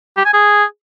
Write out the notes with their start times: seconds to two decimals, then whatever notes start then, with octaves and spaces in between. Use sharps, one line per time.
0.17 G4
0.25 G#5
0.33 G#4